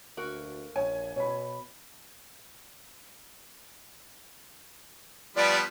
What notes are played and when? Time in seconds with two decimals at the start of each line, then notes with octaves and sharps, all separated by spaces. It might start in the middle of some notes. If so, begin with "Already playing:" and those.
0.17 D2 A#3 F#4 A#4
0.76 A#1 C#5 G#5
1.16 B2 C#5 B5
5.36 F3 G3 B3 D5